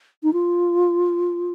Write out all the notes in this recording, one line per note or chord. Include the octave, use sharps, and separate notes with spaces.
D#4
F4